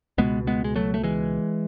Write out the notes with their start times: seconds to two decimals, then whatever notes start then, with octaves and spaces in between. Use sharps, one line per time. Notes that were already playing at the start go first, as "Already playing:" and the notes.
0.18 C#2 B2 G#3 B3
0.47 G#3 B3
0.64 G#3
0.76 F#3 A3
0.94 A3
1.03 E3 G#3